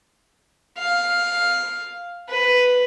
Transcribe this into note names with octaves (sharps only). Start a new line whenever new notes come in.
F5
B4